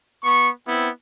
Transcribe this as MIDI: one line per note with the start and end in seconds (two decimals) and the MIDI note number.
0.23 0.50 59
0.23 0.50 85
0.66 0.87 59
0.66 0.87 60
0.66 0.87 64